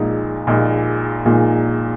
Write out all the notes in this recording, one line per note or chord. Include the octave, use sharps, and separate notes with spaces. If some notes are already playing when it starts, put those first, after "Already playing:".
Already playing: A#1 A#2 G#3 D#4
A#1 A#2 G#3 D#4
A#1 A#2 G#3 D#4